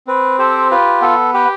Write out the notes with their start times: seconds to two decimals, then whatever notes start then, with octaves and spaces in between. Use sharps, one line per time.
0.07 C4 B4
0.38 G4 A4 C5
0.71 F4 B4
1.02 B3 A4
1.34 G4 B4